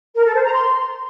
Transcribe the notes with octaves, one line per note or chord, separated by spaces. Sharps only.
A#4
A4
C5
A#5
C6